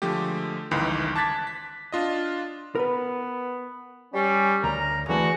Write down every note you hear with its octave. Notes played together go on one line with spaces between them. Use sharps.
D3 F3 G#3 A3 G4
G1 C#2 D#3 E3 B5 C6
A5 D6 F#6 G#6 A6 B6
B6
D4 F4 D#5
B3 A#4 B4
G3 C#4
D2 A#4 A#5
E2 D3 E3 A3 F#4 G#4